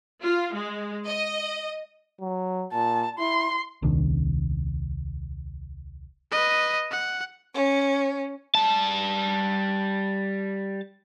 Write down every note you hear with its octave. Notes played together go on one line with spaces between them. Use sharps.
F4
G#3
D#5
F#3
A#2 A5
E4 C6
D#1 C2 D#3 D4
B4 D#5
F#5
C#4
G3 A5